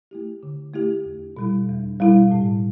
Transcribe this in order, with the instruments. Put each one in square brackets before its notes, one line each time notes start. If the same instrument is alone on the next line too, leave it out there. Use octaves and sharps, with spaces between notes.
[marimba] A3 E4 G4
D3
A3 E4 G4
E2
B2 G3 E4
E2
B2 G3 E4
A2